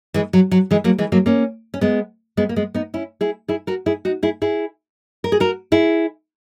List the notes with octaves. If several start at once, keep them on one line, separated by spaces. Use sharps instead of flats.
E3 G#3
F#3
F#3
E3 G#3
F#3 A#3
E3 G#3
F#3 A#3
A#3 C#4
C#4
G#3 B3
G#3 B3
A#3
G#3 B3
B3 D#4
C#4 E4
E4 G#4
E4 G#4
F#4 A#4
E4 G#4
D#4 F#4
E4 G#4
E4 G#4
A#4
G#4
F#4 A#4
E4 G#4